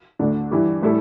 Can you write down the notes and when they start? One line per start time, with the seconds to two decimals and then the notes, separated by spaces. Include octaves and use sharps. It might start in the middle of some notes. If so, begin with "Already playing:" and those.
0.19 D2 D3 A3 D4
0.51 G2 E3 G3 E4 G4
0.83 A2 G3 E4 A4